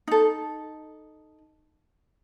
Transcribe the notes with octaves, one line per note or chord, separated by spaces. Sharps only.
D#4 A4